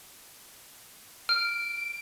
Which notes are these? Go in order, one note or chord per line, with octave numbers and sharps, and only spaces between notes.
F6 D7